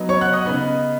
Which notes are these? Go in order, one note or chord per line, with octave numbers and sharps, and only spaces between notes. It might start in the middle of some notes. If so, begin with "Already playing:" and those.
Already playing: F#3 B3 D#4
C#5 C#6
F#5 F#6
D#5 D#6
C#3 B3 D#4